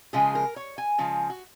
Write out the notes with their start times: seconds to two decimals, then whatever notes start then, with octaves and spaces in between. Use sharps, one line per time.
0.13 C#3 F3 G#3 G#4
0.35 A#4
0.56 C#5
0.78 G#5
0.98 C#3 F3 G#3
1.30 F#4